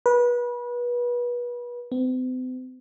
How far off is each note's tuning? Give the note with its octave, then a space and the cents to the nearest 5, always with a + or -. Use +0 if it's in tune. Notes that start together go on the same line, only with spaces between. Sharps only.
B4 -30
C4 -45